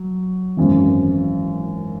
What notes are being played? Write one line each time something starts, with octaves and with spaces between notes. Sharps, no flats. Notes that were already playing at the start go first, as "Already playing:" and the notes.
Already playing: F#3
G#1 F#2 E3